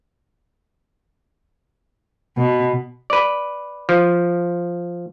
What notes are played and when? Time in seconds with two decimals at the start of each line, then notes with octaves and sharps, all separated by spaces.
2.37 B2
3.10 B4 D5
3.89 F3